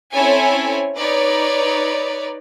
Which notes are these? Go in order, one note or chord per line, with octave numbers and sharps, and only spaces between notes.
C4 C#4 E4 A4 C#5 G#5
D#4 B4 C#5 D5